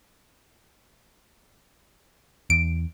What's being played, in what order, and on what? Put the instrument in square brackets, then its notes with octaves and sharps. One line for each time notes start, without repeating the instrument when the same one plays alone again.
[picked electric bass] E2 [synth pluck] D7